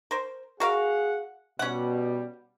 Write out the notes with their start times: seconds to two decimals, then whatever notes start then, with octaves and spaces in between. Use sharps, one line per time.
0.11 A#4 C5
0.60 F#4 G#4 A#4 F5 F#5
1.59 B2 G3 C#4 F#5